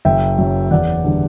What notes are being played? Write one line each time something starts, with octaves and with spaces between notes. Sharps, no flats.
F#1 E5 G5
F#2 F#3
E2 D5 F#5
D3 G3